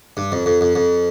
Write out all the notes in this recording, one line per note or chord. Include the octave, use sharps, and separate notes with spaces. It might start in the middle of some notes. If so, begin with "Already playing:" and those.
G2
F2
F2
F2
F2